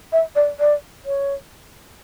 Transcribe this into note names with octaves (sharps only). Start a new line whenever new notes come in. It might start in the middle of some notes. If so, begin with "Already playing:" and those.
E5
D5
D5
C#5